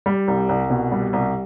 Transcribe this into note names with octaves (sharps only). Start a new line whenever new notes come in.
G3
C2
C2
B2
G3
C2